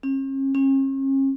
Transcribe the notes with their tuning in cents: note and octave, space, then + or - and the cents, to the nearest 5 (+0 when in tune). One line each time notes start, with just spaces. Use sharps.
C#4 -40
C#4 -40